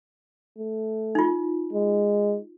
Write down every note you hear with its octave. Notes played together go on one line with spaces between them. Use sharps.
A3
D#4 F4
G#3